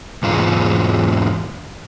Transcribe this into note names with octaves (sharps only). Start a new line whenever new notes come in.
E2 G#2 F4